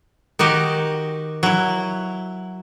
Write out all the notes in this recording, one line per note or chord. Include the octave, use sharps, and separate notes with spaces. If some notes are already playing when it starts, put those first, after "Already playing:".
D#3 D#4 F#4 G4
F#3 E4